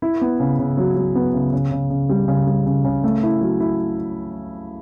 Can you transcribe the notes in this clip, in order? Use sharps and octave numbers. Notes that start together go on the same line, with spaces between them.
E4
B3
C#3
C#3
F#3
F#3
B3
C#3
C#3
C#3
C#3
G3
C#3
G3
C#3
C#3
A3
E4
F#3
E4